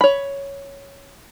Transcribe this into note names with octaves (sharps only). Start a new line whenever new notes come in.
C#5 B5